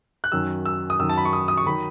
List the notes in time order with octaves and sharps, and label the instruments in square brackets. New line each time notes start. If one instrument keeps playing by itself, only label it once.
[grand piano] F#6
F#2 D#3 F#3 E6
E6
D#6
F#2 D#3 F#3 E6
A5
B5
C#6
D#6
D#6
C#6
D#3 F#3 B5